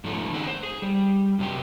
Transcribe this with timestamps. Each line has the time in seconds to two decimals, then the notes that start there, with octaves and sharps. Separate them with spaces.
0.04 G#2 F3 A3 C#4 D#4
0.32 D#3 C4 D#4 G#4 F#5
0.47 C5
0.63 G#4
0.82 G3
1.39 F#2 C3 D4 G4